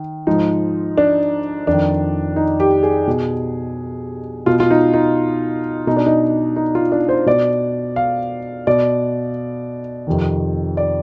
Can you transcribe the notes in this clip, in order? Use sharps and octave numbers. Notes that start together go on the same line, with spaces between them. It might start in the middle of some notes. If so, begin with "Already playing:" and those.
Already playing: D#3
G#2 F3 D#4
D4
F2 D#3 D4
D#4
G4
G#4
B2
B2 F4
F4
D#4
D#4
B2 D#4
D4
D#4
D#4
F4
D4
C5
B2 D5
F5
B2 D5
F2 C3 D#3
D5